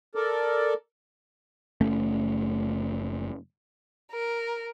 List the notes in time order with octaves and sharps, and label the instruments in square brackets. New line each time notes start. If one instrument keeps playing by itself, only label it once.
[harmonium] A4 A#4 D5
[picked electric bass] F#1 A3 C#4
[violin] A#4